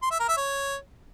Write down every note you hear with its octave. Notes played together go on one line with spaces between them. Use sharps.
C6
E5
A#4
E5
C#5